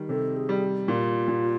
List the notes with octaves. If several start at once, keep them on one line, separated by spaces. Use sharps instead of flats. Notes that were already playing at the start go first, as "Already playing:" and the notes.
Already playing: D#3 G3
C3 A4
G#4
G3
A#2 F4
A#2